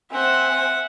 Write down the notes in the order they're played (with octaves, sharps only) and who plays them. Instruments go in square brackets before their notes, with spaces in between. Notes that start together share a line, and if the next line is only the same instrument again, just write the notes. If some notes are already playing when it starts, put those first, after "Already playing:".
[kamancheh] C4 G#5 [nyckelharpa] E5 F#5